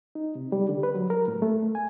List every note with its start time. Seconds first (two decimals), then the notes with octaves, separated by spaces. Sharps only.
0.15 D#4
0.35 C3
0.52 G3
0.69 D3
0.83 B4
0.95 F#3
1.10 A#4
1.28 A2
1.42 A3
1.75 G#5